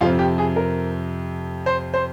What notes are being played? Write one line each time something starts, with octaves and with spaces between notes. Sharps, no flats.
F2 C3 F3 C4 F4
G4
G#4
A#4
C5
C5